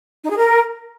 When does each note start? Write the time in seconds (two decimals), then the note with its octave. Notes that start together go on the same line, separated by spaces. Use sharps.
0.23 D#4
0.30 G#4
0.37 A#4